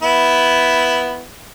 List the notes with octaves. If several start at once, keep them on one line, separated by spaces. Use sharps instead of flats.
B3 E4